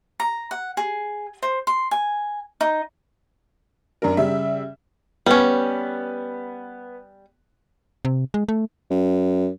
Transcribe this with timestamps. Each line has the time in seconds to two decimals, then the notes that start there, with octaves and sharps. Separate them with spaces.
0.20 A#5
0.51 F#5
0.77 G#4
1.42 C5
1.67 C6
1.91 G#5
2.61 D#4
4.02 F#2 D4 A#4
4.17 C#3 G3 E5
5.26 G3 B3 C#4
8.05 C3
8.34 G#3
8.49 A3
8.91 F#2